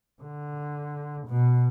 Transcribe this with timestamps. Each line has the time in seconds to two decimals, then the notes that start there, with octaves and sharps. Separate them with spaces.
0.22 D3
1.27 B2